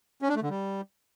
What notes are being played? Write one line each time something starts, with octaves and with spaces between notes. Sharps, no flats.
C#4
D4
A3
D3
G3